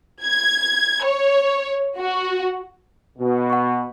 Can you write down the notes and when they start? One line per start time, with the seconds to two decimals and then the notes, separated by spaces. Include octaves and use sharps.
0.24 G#6
1.05 C#5
1.97 F#4
3.18 B2
3.50 F#5 C#6